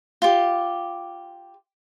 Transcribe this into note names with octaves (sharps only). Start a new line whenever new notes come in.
F4 G4